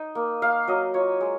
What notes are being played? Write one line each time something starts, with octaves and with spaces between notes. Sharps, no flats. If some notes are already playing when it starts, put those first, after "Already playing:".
Already playing: D#4 D#5
A#3
A#3 F5
F#3 D#5
F4 C#5
G#3